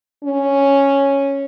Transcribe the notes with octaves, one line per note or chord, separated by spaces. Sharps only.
C#4